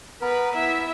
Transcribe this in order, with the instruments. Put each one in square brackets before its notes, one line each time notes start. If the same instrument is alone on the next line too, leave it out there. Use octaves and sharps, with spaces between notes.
[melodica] B3 A#4 [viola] B4
[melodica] B3 [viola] E4 E5